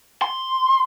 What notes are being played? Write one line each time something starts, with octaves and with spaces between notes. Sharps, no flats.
C6